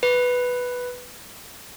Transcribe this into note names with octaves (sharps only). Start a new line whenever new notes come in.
B4